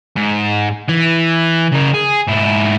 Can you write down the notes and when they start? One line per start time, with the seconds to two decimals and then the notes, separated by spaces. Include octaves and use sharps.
0.17 G#2
0.89 E3
1.72 C#3 A#4
1.93 G#4
2.27 G#2 E4